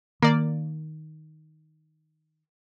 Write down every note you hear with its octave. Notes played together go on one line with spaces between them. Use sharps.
D#3 A#3 D5